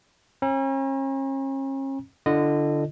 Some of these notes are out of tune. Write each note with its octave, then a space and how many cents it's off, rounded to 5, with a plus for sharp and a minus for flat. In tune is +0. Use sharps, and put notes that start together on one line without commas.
C#4 -40 A#5 +40
D3 +0 F4 -45 D#5 -15